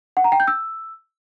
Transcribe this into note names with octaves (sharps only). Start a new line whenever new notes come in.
F#5
A#5
G5
G6
E6